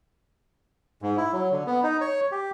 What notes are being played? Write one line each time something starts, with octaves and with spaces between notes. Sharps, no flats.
G#2
E4
F#3
D3
B3
D#4
C#5
G4